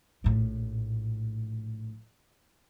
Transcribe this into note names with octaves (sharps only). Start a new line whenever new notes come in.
A#1 A2